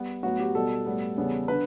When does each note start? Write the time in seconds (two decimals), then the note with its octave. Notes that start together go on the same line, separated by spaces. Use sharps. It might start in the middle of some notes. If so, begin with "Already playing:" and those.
Already playing: G3 B3
0.23 A2 F#3 B3 F#4
0.40 G4
0.55 B2 G3 B3 A4
0.86 A2 G3 B3
1.17 E2 C#3 G3 B3
1.48 D3 B4